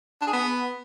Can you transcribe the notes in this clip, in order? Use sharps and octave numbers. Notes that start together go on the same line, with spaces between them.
D4
G#4
B3